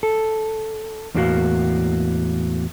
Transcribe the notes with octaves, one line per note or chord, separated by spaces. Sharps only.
A4
E2 A2 A#3 E4 F#4 F5